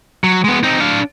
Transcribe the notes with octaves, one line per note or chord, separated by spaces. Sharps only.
F#3
G#3 B3
C4 D#4
D4 F5